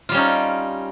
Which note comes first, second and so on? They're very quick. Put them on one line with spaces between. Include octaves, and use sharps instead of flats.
F4 G3 C#4 D#4